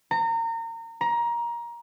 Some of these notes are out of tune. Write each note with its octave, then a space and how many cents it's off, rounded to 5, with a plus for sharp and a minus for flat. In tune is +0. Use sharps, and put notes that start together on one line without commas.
A#5 -30
A#5 +20